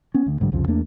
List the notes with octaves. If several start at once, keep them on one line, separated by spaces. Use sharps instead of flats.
B3 C#4
D2 D3
B1 G#2 D3 G3
C2 F2 C#3 F3
E2 A3 A#3 D4